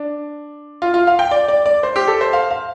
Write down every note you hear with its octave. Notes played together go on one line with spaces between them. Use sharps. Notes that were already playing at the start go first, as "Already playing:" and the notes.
Already playing: D4
F4
F4
F5
G5
D5
D5
D5
C5
G4
A4
C5
F5
F5